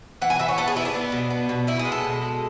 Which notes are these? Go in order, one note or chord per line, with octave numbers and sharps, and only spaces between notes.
E3 F#5
G#5
E3 E5
C#5
B3 A4
G#4
B3 E4
D4
B3
B2
B3
B2
B3 E4
G#4
G#3
A4
B2
G#3